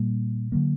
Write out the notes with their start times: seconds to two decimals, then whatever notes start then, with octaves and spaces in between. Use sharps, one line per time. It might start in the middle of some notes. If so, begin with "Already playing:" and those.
Already playing: A#2 G3 A#3
0.52 D3 F#3 A#3